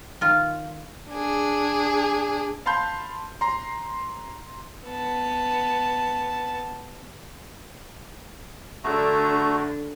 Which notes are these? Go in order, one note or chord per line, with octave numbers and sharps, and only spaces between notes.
D#3 F4
D4 G#4
F5 A5 B5 C6 G6
A#5 C6
B3 A5
D3 A3 D4 F#4 A#5